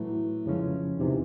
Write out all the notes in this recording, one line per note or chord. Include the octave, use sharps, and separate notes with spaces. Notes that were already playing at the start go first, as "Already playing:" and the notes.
Already playing: A2 E3 F#3 A3
F2 C#3 F3 G#3 C#4
E2 C3 D#3 E3